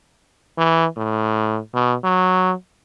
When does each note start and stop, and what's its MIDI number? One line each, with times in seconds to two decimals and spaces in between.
0.58 0.86 52
0.97 1.60 45
1.74 1.95 47
2.04 2.53 54